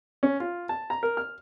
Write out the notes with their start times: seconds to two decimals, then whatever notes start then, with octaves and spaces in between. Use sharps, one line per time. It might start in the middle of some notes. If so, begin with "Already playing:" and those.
0.23 C#4
0.40 F4
0.69 A5
0.90 A#5
1.03 A#4
1.17 F6